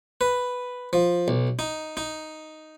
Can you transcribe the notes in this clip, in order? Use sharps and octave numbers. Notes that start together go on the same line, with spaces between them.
B4
F3
B1
D#4
D#4